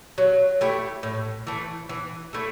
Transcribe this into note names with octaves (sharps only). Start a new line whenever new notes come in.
F#3
A3 E4 G4
A2
E3 A3
E3
A3 E4 A4